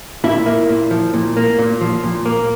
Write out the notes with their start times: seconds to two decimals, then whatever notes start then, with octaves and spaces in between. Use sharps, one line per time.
0.24 A#2 E4 E5
0.46 A#3
0.70 A#2
0.91 F3
1.14 A#2
1.37 A#3
1.59 A#2
1.81 F3
2.04 A#2
2.26 A#3